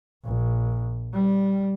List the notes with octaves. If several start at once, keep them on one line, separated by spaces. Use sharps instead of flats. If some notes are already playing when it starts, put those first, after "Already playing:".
A#1
G3